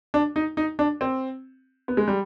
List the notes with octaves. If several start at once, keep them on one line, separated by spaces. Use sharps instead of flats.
D4
D#4
D#4
D4
C4
B3
G#3
G3